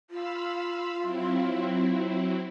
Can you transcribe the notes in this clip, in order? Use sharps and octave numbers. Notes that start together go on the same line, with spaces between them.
F4 F5 B5 E6
F#3 C4 E4